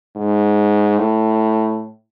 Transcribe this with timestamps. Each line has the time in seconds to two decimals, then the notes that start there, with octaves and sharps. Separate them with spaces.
0.16 G#2
0.98 A2